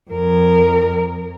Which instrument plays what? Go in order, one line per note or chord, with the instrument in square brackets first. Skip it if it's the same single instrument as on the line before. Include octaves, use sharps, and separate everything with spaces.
[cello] F2 A#4